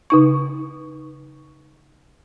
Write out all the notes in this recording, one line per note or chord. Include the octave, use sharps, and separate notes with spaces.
C#3 D#4 C#6